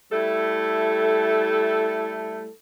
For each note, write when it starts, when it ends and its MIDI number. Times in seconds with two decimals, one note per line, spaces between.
0.12 2.49 55
0.12 2.49 57
0.12 2.49 64
0.12 2.49 69